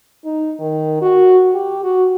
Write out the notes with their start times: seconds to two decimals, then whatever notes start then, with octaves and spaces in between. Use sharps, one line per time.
0.25 D#4
0.60 D#3
1.02 F#4
1.54 G4
1.83 F#4